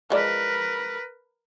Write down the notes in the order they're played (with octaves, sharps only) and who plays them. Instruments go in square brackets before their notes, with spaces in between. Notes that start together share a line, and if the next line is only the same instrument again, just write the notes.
[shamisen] F3 G#3 D5 [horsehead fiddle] A#4 B4